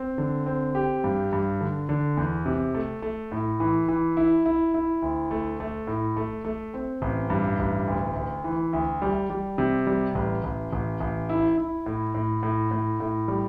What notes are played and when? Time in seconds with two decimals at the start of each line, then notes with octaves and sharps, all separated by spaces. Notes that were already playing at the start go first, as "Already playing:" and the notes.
Already playing: C4
0.18 D3
0.46 C4
0.75 G4
1.04 G2
1.33 G2
1.61 D3
1.89 D3
2.17 E2
2.46 C3
2.74 A3
3.02 A3
3.32 A2
3.60 E3
3.88 E3
4.17 E4
4.45 E4
4.74 E4
5.02 D2
5.31 A3
5.60 A3
5.87 A2
6.16 A3
6.45 A3
6.74 C4
7.02 A1
7.30 G2
7.59 A1
7.88 D2
8.15 D2
8.44 E3
8.73 D2
9.02 G3
9.30 G3
9.58 C3
9.87 G3
10.15 A1
10.44 A1
10.73 A1
11.00 A1
11.29 E4
11.58 E4
11.86 A2
12.14 A2
12.43 A2
12.71 A2
13.00 A2
13.28 G3